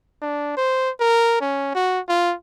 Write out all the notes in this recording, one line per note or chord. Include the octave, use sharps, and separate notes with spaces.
D4
C5
A#4
C#4
F#4
F4